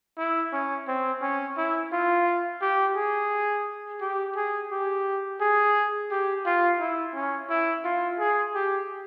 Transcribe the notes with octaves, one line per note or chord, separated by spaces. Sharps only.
E4
C#4
C4
C#4
E4
F4
G4
G#4
G4
G#4
G4
G#4
G4
F4
E4
C#4
E4
F4
G#4
G4